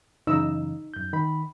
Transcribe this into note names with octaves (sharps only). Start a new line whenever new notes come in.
F#2 C#3 E3 D#4 D#5 E6
F#2 G6
D#3 B5